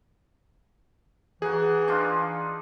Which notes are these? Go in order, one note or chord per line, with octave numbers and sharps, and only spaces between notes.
E3 D#4 F#4 G#4
D4 D#4 F4